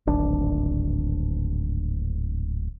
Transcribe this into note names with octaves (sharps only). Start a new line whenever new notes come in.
D1 G#1 D4